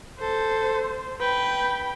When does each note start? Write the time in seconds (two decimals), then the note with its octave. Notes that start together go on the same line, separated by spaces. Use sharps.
0.19 A4 C5
1.20 B4 G5 B5